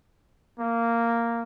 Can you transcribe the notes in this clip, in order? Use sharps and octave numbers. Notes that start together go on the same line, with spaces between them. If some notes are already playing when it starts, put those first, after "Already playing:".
A#3